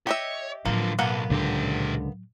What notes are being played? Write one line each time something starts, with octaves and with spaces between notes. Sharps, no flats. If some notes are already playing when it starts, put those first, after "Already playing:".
G4 C#5 D#5 E5
A2 D3 F3 F#3 A#3
B1 A#3 B3 F#5
C#2 A#2 D3 G4